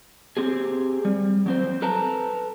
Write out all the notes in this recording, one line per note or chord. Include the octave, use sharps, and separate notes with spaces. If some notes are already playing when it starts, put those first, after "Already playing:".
C4 G4 G#4
G3
F#3 C4 C5
A4 B4 A5 A#5